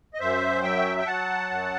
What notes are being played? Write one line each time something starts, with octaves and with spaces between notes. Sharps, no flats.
D#5
F#2 C5 E5
F#3 E5 G5
G5
F#3 F#5 A5
F#2